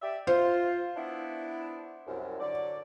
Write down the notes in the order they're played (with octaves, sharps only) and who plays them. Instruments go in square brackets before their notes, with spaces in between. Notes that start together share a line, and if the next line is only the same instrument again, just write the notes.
[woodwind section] G4 D5 E5
[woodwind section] F4 [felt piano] C5
[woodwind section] B3 D4 E4
C2 F#2
D3 F#3 D5